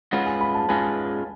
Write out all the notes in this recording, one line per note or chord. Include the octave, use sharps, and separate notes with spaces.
G#2 G#3 C#4 F4 B4 F#5
G#5
B5
A5
G#2 G#3 C#4 F4 B4 G#5